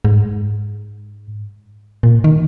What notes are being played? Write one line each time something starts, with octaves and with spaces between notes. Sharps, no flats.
G#2
A#2
D#3